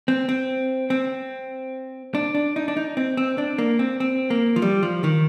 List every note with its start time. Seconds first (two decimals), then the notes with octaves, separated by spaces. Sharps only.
0.08 C4
0.29 C4
0.90 C4
2.15 D4
2.35 D4
2.56 D#4
2.68 D4
2.77 D#4
2.97 C4
3.17 C4
3.38 D4
3.58 A#3
3.79 C4
4.00 C4
4.30 A#3
4.56 F3
4.62 G3
4.83 F3
5.04 D#3